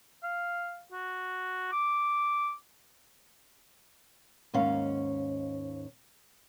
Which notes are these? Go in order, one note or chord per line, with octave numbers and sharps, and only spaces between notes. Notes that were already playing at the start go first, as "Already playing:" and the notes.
F5
F#4
D6
D#2 G#2 C#4 F5